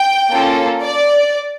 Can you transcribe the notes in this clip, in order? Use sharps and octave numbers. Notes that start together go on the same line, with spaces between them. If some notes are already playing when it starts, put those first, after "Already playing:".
Already playing: G5
A#3 C#4 F4 A4
D5